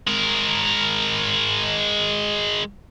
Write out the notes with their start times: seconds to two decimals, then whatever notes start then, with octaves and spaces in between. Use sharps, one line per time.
0.07 G#3 A#4